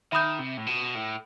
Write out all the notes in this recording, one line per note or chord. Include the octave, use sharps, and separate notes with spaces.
D#3 E5 B5 D#6 G6
C3
A2
B2
A2